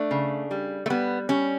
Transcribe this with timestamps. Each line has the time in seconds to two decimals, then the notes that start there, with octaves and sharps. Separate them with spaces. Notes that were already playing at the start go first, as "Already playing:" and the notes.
Already playing: A3 D4
0.11 C#3
0.51 G3
0.86 A3
0.90 G3 B3
1.29 G3 C#4